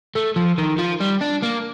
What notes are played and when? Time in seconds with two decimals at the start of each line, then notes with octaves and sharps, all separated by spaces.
0.16 A3
0.36 F3
0.58 D#3
0.78 F3
1.00 G3
1.21 D4
1.42 A#3